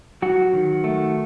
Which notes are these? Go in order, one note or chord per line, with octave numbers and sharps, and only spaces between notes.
F#3 F#4
D#3
A3